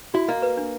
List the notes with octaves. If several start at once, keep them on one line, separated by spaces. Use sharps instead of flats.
E4 F#4
A#3 D#5
B4
D4